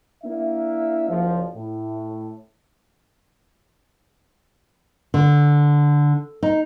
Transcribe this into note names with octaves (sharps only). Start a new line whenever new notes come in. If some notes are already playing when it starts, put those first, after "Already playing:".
A#3 D4 E4 E5
F#1 F3
A2
D3
D#4